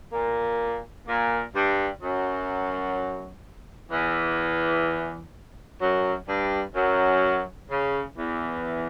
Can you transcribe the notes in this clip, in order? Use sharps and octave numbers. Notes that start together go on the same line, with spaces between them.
A#2 A#3
A#2 A#3
G2 G3
F#2 F#3
E2 E3
F#2 F#3
G2 G3
F#2 F#3
C#3
E2 E3